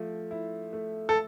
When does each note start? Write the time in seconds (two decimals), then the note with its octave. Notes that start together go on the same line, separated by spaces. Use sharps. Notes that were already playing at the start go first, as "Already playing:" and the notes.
Already playing: F3 A3
0.31 E4
0.73 A3
1.09 A4